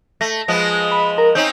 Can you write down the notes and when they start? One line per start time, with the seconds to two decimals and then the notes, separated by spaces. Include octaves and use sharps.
0.21 A3 A#6
0.48 F3 G#3 B3
0.92 B5
1.18 A#4
1.35 C4 C#4 D#4 G6